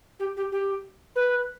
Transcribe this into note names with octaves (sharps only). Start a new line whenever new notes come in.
G4
G4
G4
B4